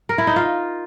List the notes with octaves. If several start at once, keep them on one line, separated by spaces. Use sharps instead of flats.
A#4
E4
D#4
F4